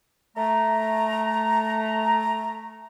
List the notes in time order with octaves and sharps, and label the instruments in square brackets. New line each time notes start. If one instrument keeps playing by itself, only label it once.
[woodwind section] A3 A#5